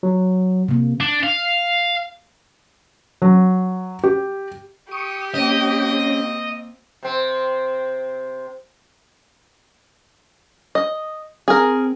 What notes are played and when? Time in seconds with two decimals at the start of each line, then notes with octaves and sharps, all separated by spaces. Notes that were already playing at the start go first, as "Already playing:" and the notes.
0.03 F#3
0.68 C3 A#3
1.00 D4
1.24 F5
3.22 F#3
4.04 G4
4.91 G4 C#6 D#6
5.34 A#3 C4 C#4 D#5
7.03 C3 C4
10.75 D#5
11.48 C4 G#4 A#4